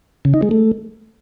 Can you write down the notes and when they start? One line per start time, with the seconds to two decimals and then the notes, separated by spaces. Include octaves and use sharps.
0.25 C#3
0.34 D#4
0.42 G#3
0.51 A3